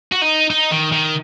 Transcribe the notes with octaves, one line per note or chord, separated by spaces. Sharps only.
F#4
D#4
D#4
D#3
D#3